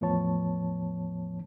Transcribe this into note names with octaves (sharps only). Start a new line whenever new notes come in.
E2 A2 F3 B3 C#5 A5